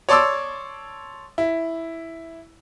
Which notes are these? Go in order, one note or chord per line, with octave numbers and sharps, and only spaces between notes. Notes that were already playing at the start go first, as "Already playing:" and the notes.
C#5 D5 A5 C6 D6 E6
E4